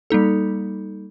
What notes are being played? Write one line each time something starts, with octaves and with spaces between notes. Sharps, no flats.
G3 A#3 D#4 A4